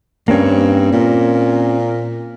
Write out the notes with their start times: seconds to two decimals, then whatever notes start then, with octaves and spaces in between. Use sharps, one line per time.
0.28 G2 A#3 C4 C#4
0.92 A#2